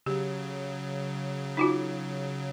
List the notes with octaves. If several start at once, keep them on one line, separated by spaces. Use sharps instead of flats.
C#3 F#3 G4
D#4 F4 F#4